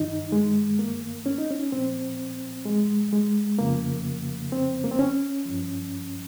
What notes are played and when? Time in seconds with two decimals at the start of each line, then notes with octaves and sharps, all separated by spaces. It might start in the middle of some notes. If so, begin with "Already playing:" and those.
Already playing: G2 D#3 D#4
0.32 G#3
0.79 A#3
1.26 C#4
1.38 D#4
1.50 C#4
1.72 A#2 F3 C4
2.66 G#3
3.13 G#3
3.59 F2 C#3 F3 A#3
4.52 C4
4.84 A#3
4.91 C4
4.99 C#4
5.45 G2 F3